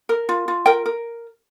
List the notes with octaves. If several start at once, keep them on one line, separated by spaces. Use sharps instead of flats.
A#4
F4
F4
A#4 G5
A#4